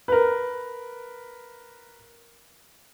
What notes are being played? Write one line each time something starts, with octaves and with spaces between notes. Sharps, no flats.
A#4 B4